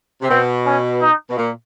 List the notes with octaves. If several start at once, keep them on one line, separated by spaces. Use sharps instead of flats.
C3
B2 C4
C#4
D#4
B2
A#2